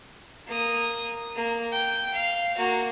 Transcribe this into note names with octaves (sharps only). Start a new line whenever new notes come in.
A#3 D#6
A#3
G5
F5
A#3 F#4